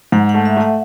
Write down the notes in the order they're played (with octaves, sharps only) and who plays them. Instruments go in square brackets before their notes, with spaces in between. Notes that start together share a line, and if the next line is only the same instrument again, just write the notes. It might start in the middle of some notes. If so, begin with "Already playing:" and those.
[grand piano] G#2 [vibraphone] F#5
[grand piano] A3 [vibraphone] F#5
[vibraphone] E5
[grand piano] A3 [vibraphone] F#5